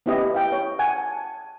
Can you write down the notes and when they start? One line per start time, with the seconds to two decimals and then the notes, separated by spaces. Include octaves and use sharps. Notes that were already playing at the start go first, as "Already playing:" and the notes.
0.06 B3 C#4 E4 G4 D#5
0.34 F5 G5
0.52 C#5
0.79 F#5 G#5
0.98 A5